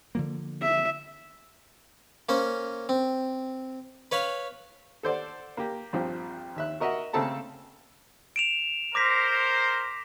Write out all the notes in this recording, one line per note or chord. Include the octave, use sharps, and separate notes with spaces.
D3 F3 A#3
E5
A#3 C#4 C5
C4
B4 C#5 F5 B5
A4 C5 D5 F#5
A#3 G4
A#1 G2 F3 C4 G4
D#2 E5 F#6
F#4 A#4 D#5 E5 F#5
C#3 A3 C4 A4 A5 A#5
D7 E7 F7
A#4 C5 D6 A#6 B6